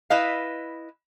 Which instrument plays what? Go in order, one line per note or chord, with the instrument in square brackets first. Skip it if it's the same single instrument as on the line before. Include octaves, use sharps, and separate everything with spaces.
[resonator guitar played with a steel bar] E4 B4 D#5 F5